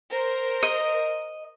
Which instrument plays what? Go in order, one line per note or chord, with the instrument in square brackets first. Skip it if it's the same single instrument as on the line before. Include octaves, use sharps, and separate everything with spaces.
[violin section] A#4 C5
[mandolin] D#5